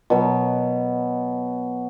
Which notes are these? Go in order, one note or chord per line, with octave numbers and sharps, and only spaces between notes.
B2 F#3